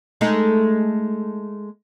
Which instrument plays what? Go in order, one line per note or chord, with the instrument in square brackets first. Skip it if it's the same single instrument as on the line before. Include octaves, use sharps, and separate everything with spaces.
[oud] G#3 A3 D#4